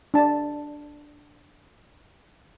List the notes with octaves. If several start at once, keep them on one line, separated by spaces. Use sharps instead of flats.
D4 A5